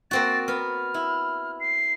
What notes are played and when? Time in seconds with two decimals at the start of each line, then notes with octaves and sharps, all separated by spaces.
0.11 A#3 C4 F#4 A6
0.48 B3 F6
0.94 E4
1.60 C7